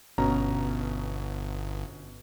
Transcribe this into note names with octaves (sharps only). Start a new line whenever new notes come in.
G1 B2 C#4 A#5